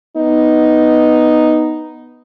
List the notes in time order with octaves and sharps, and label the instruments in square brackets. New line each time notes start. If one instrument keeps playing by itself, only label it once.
[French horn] B3 [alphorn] D#4